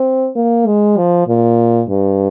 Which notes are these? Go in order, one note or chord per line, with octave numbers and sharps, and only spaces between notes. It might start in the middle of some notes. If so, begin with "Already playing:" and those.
Already playing: C4
A#3
G#3
F3
A#2
G2